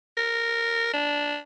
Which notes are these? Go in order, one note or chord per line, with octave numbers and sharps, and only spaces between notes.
A#4
D4